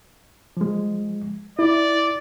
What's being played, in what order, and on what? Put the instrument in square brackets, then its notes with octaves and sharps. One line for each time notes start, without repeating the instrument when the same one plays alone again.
[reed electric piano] F3 G#3
[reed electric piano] E4 [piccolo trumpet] D5